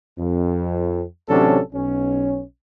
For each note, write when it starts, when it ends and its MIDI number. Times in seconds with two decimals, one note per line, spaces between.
0.18 1.03 41
1.29 1.61 33
1.29 1.61 48
1.29 1.61 54
1.29 1.61 61
1.29 1.61 62
1.29 1.61 69
1.73 2.42 35
1.73 2.42 61